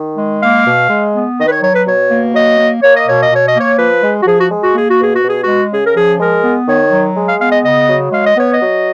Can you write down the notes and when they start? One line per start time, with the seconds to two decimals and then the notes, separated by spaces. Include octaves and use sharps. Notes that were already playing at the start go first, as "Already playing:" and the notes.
Already playing: D#3
0.17 G#3
0.42 A#3 F5
0.66 B2
0.90 G#3
1.14 B3
1.37 D#3 D#5
1.45 B4
1.50 C#5
1.62 F#3 C#5
1.74 B4
1.85 B2 C#5
2.11 A#3
2.34 F#3 D#5
2.58 A#3
2.82 A#3 C#5
2.95 D#5
3.06 B2 C#5
3.21 D#5
3.31 B2 C#5
3.47 D#5
3.55 A#3
3.60 C#5
3.78 F3 B4
4.03 G#3
4.21 F#4
4.26 F3 G#4
4.38 F#4
4.51 G#3
4.62 F#4
4.75 A#3 G#4
4.89 F#4
4.99 B2 G#4
5.15 F#4
5.23 B2
5.28 G#4
5.42 G#3 F#4
5.71 C#3 G#4
5.85 A#4
5.95 F3 G#4
6.19 G#3 A#4
6.43 B3
6.67 D#3 C#5
6.91 F#3
7.15 G#3
7.28 F5
7.39 B3 F5
7.51 D#5
7.63 C#3 D#5
7.87 F#3
8.11 G#3 F5
8.25 D#5
8.36 B3 C#5
8.52 D#5
8.60 F#3